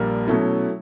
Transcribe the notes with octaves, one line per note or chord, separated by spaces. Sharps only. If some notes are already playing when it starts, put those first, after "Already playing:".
Already playing: A#1 A#2 G3 A#3
B2 F#3 A3 C#4 E4